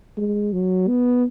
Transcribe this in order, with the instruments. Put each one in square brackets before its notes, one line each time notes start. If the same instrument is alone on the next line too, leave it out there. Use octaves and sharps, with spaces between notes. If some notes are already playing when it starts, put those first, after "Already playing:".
[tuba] G#3
F#3
B3